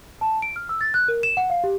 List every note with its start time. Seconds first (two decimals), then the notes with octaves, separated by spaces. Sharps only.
0.21 A5
0.42 D7
0.56 F6
0.69 E6
0.81 A6
0.94 F#6
1.08 A#4
1.23 E7
1.37 F#5
1.50 F5
1.64 G4